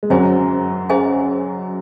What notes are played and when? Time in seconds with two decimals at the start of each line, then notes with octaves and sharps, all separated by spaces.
0.03 G#3
0.10 F#2 F#3 C#4 G#4 C5 D#5 G#5
0.89 C#4 G#4 C5 D#5 G#5